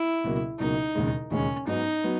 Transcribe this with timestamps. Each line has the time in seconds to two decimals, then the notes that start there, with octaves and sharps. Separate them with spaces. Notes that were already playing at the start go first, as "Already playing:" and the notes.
Already playing: E4
0.24 C#2 B2 F#3 A#3
0.59 C#2 B2 F#3 A#3 D#4
0.95 E1 D#2 C#3 G#3
1.31 E1 D#2 C#3 G#3 C#4
1.67 G#2 F#3 B3 D#4
2.04 F#3 B3